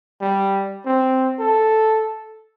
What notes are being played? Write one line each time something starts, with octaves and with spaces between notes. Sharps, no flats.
G3
C4
A4